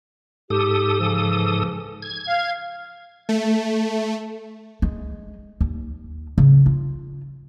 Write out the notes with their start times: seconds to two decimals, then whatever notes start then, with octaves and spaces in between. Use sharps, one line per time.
0.50 G#2 G4 A4 D#6
0.99 C#3 E3 F3
2.02 G#6
2.27 F5
3.29 A3
4.82 G#3
5.61 D#2
6.38 C#3
6.66 F4